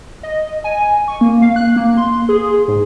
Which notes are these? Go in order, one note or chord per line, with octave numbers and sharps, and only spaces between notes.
D#5
G#5
C#6
A#3
F5
F#6
A#3
C6
G#4
G#2